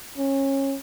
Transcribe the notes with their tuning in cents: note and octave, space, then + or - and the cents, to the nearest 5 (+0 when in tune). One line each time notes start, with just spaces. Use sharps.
C#4 -25